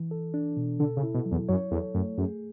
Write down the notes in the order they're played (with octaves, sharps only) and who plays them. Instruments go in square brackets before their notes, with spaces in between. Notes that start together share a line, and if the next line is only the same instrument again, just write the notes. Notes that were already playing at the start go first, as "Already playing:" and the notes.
Already playing: [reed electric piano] E3
A4
D4
B2
[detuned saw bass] D3 [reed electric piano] A4
[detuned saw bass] C#3
[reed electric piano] E4
[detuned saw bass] B2
[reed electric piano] F#3
[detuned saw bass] E2
[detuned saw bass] F#2 [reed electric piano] C#5
[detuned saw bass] E2 [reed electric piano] A4
[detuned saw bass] F#2 [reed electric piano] A3
[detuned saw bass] F#2 [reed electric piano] G#4